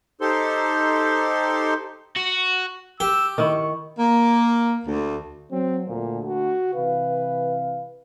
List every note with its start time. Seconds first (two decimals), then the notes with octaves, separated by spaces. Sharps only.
0.21 D#4 G4 A4 C5 C6
2.16 F#4
3.00 G4 E6
3.38 D#3 E4 C#6
3.99 A#3
4.86 D2
5.51 F#3 C4
5.88 D2 A#2 D3
6.24 F#4
6.74 C3 E3 B4 F5